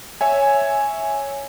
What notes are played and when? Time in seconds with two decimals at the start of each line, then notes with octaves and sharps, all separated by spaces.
0.21 C#5 E5 G#5